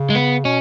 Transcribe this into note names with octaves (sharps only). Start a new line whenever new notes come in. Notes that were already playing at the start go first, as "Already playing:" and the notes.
Already playing: C#3
G#3
B3
B2 C#4